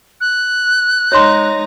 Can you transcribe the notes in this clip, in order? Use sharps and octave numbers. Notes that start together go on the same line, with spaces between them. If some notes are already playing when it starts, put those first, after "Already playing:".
F#6
G#3 D#4 C#5 C6 A#6